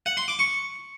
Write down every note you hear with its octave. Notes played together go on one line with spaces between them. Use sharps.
F#5
C6
D6
C#6